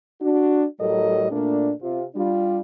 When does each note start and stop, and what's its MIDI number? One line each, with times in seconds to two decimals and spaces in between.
0.21 0.64 62
0.21 0.64 66
0.80 1.26 45
0.80 1.26 54
0.80 1.26 55
0.80 1.26 69
0.80 1.26 70
0.80 1.26 75
1.31 1.72 46
1.31 1.72 57
1.31 1.72 58
1.31 1.72 62
1.82 2.04 48
1.82 2.04 65
2.15 2.59 55
2.15 2.59 62
2.15 2.59 65